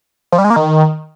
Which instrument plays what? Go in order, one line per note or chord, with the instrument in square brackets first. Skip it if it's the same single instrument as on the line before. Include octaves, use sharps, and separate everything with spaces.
[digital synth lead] F3
G3
G#3
A#3
D#3